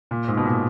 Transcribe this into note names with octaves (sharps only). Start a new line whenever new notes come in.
A#2
G#2
B2
A#2